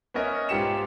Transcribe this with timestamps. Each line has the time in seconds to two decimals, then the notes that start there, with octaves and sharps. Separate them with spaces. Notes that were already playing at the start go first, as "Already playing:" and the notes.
0.14 B3 C#4 A#4 D#5 E5
0.49 G#2 F4 G4 C#7 E7